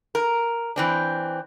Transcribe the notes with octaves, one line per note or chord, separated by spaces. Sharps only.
A#4
E3 C4 D4